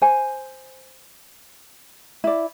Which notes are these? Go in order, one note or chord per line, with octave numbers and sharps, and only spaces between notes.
C5 G#5
E4 D5